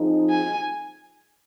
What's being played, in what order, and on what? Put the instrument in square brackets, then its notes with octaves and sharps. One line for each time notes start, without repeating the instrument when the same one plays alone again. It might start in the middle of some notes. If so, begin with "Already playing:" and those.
Already playing: [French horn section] F3 C4 D#4 G#4
[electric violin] G#5